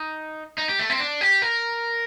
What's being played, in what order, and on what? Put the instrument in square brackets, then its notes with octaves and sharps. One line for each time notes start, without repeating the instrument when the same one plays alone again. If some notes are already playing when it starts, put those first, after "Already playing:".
Already playing: [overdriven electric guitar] D#4
D#4
G4
A3
C4
D4
G4
A#4